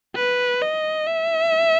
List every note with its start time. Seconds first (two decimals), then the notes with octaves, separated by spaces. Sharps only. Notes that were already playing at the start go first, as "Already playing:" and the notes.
0.15 B4
0.61 D#5
1.07 E5